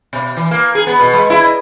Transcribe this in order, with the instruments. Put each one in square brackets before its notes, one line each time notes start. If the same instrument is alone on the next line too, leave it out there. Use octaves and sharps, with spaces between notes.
[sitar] B2
E3
A#3
G#4
B3
B2
G#3
E4
D#5